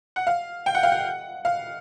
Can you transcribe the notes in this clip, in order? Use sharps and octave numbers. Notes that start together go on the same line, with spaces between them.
F#5
F5
G5
F#5
F5
F#5
F5